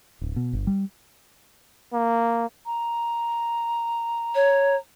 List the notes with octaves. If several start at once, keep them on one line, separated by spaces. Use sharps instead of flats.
D1
B2
G1
G3
A#3
A#5
C#5